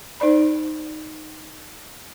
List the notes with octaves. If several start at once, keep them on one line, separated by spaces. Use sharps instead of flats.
D#4 C5 D5 B5